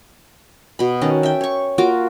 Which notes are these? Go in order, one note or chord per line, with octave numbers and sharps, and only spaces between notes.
B2 B5
D#3 C#4 F#5 A5
E5 G5
C#5 C#6
A#3 F4 F#4 D6